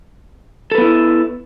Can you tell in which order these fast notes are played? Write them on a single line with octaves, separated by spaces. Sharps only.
A4 B4 B3 E4